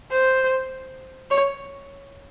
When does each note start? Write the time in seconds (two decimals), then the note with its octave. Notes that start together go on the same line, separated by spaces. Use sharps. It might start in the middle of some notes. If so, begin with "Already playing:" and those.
0.12 C5
1.31 C#5